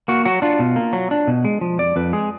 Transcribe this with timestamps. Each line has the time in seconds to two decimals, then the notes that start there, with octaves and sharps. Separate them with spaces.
0.08 A#3 F#4
0.25 F#3 F#4
0.42 D4 F4
0.59 B2
0.76 A#3
0.93 F#3
1.11 D4
1.27 B2
1.45 G#3
1.61 F3
1.78 F2 D5
1.96 F2 B4
2.13 G#3 G#4